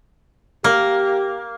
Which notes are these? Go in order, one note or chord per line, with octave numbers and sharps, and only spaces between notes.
A#3 G4